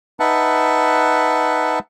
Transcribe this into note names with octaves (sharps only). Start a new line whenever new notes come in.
D#4 B4 E5 F#5 A5